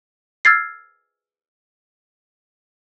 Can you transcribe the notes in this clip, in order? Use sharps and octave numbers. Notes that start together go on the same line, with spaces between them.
E6 F6 G#6 A6 C7